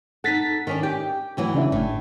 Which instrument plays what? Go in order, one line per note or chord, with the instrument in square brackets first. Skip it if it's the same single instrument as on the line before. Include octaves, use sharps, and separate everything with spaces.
[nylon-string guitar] D#4 A4 [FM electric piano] F#5 A6 B6
[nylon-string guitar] D#3 C#4 D4
[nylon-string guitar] G4 [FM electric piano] G5
[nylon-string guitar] D2 E3 F#3
[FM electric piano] C#3 D4 E4
[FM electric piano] G1 [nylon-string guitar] A2